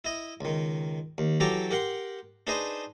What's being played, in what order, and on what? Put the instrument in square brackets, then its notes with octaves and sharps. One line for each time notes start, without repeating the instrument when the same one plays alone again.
[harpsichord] E4 D#5
C#2 D#3
D#2
E3 F#3 G4 A4 A#5 D6
G4 A#4 F#5 C6
D4 D#4 G#4 B4 C5 D#5